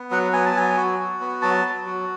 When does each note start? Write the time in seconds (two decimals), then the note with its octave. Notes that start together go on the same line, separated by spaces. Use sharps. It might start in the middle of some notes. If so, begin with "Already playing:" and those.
Already playing: B3
0.11 F#3 F#5
0.33 B3 G#5
0.46 A5
0.55 F#3 G#5
0.77 F#4
1.00 F#4
1.21 B3
1.42 F#3 A5
1.65 F#3
1.86 F#4